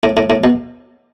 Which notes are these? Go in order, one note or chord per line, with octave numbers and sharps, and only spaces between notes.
A2
A2
A2
B2